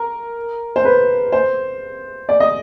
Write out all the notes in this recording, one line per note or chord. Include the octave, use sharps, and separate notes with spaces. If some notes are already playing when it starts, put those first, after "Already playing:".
Already playing: A#4
C5
B4
C5
D5
D#5